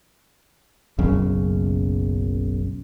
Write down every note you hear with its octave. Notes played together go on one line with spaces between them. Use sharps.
F#1 B1 F#2 C#3